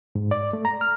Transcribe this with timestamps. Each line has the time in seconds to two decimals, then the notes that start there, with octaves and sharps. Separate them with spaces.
0.15 G#2
0.31 D5
0.53 A3
0.65 A#5
0.81 F6